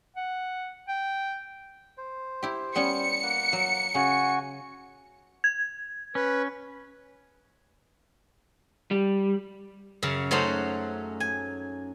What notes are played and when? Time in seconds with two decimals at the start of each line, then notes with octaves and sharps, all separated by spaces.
0.17 F#5
0.88 G5
1.97 C5
2.43 E4 G4
2.75 G3 B3 C#4 C#7
3.23 A#3 F#5
3.53 F#3
3.94 C#3 F#4 G#5
5.44 G#6
6.15 C#4 B4
8.91 G3
10.03 F#2 C#3
10.31 F#3 A3 C#4 D#4 C5 F#5
11.20 G#5